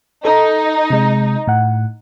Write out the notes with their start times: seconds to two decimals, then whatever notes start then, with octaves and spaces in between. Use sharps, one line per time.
0.25 D#4 A4
0.90 C3 G#3
1.48 A2 F#5